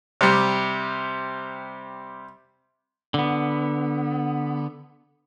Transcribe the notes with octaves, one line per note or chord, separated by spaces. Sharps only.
C3 G3
D3 B3